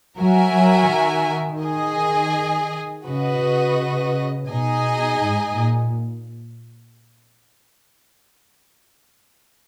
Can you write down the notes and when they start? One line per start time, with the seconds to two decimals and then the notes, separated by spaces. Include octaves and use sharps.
0.19 F#3 F#4 A#4 E5 G#5
0.56 F#3
0.91 D#3
1.62 G#4 D#5 G#5
3.05 C#3 F#4 B4 D#5
3.41 C#3
4.49 B2 D#4 G#4 D#5 G#5
5.20 G#2
5.56 A#2